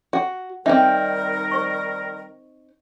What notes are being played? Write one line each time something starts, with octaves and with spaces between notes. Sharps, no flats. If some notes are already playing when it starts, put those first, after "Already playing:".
F#4
D#3 G3 C4 D#4 A#4 D#5 E5
C5 C#6